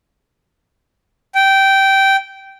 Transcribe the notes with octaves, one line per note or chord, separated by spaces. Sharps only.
G5